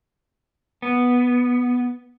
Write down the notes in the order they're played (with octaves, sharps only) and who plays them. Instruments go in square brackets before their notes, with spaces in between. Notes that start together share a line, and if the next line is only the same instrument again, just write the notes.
[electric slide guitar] B3